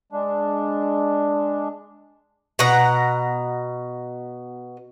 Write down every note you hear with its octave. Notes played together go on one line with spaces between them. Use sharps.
G#3 D4
B2 F#5 A#5